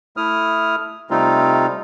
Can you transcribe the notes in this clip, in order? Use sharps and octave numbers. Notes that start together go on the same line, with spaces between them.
A3 E4 D#6 F6
C3 G3 A3 C4 D#4 F4